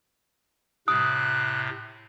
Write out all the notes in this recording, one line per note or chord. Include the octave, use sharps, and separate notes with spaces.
A2 C3 D#6 F#6